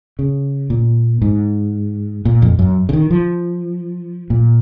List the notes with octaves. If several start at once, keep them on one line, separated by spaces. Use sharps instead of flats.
C#3
A#2
G#2
A#2
F2
F#2
C#3
D#3
F3
A#2